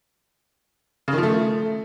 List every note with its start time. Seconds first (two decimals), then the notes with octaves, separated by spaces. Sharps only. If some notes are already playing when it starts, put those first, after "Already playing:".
1.08 C#3
1.13 D#3
1.18 F3
1.23 A3